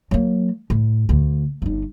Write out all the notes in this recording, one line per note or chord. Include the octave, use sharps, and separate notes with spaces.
F#3 A#3
A2
D2
G1 D#4